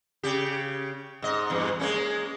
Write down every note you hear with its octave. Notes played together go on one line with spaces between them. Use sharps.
C#3 G4
G#2 D#5
E2 G2
G#3 A#3 C#4